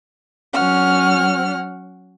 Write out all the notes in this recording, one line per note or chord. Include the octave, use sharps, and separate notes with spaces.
F#3 C#4 F#5 F6